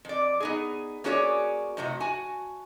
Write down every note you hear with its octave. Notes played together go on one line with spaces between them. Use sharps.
F2 D5
B3 D#4 G#4
A#3 C#4 F#4 G#4 C#5 D5
F2 A2 C3 F#4
F#4 G#5 A5